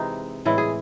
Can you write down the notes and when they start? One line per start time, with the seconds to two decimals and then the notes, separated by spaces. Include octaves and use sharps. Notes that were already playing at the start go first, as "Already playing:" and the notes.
Already playing: C3 E3 G#3 D#4
0.45 A2 E3 G#3 E4
0.58 G#4